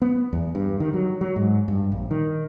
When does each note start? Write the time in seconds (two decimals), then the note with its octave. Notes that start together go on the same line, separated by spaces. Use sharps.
0.02 B3
0.33 E2
0.55 G2
0.80 D#3
0.93 F#3
1.21 F#3
1.36 G#2
1.68 G2
1.92 A#1
2.11 D#3